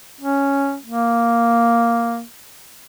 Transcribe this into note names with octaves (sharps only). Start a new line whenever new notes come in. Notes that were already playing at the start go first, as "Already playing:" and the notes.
C#4
A#3